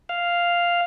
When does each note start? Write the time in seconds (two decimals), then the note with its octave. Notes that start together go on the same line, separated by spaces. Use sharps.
0.09 F5